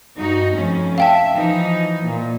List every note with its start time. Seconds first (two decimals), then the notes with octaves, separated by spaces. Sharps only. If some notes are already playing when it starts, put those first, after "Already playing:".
0.17 G2 D#4 F#4
0.55 F2 A3 C#4
0.98 E5 F5 G5 A5
1.35 E3 F3 D#4
2.05 A#2